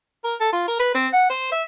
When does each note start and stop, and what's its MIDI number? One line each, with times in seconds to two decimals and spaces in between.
0.24 0.35 70
0.40 0.52 69
0.53 0.64 65
0.68 0.79 70
0.80 0.92 71
0.95 1.07 60
1.13 1.30 78
1.30 1.48 72
1.52 1.63 76